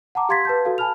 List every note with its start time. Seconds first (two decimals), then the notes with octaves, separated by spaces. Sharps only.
0.15 F#5 A5 A#5 D6
0.29 G4 F5 C6 G#6 A6 B6
0.45 B4 A5 G6
0.65 F#4 A4 F5
0.78 G#5 A5 B5 F6 F7